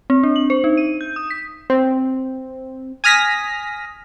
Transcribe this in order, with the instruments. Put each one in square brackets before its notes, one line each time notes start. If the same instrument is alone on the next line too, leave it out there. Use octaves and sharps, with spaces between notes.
[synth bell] C4
D4
F#7
C5
D#4
D#7
G6
D#6
B6
[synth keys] C4
G#5 D#6 F6 A#6 B6